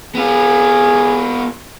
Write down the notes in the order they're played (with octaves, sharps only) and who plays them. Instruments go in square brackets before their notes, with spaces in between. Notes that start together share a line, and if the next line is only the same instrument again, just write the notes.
[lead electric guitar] B3 F4 [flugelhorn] G#4